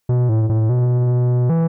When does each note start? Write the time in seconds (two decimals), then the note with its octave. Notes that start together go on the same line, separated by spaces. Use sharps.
0.09 B2
0.29 A2
0.50 A2
0.69 B2
1.50 E3